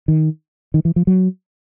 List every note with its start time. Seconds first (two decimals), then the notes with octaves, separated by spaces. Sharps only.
0.08 D#3
0.74 D#3
0.85 E3
0.96 F3
1.07 F#3